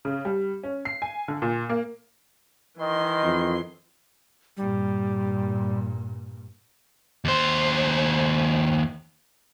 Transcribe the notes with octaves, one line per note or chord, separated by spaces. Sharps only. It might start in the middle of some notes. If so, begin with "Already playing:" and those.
C#3
G3
C#4
C7
G#5
D3
A#2
A#3
D#3 E3 D#5 C6
F2
G2 A#2 G3
D#2 C5